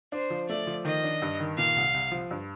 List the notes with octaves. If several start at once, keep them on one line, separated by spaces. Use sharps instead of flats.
D4 C5
F3
A3 D5
F3
D#3 D#5
D4
G2
D#3
A#2 F5
C2
C2
F3
G2